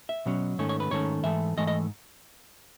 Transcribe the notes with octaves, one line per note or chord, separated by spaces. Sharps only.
E5
B2 F#3 C#4
G#2 D#3 A3 C#4 C#5
C#5
B4
G#2 D#3 A3 C#4 C#5
G#2 E3 A3 E5
G#2 E3 A3 D#5
D#5